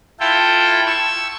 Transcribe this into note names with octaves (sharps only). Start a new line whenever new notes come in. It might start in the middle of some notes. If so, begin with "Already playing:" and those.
E4 F4 A4 G5
C#6 E6